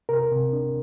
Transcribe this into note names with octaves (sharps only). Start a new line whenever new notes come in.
C3 A#4
C3
D4